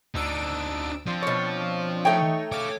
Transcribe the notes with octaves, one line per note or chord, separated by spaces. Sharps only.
D2 D4 D#4 E6 D7
F3 C4 D4 F4
B2 C#5
A3 D#4 C#5 G5
C#5 F5 D6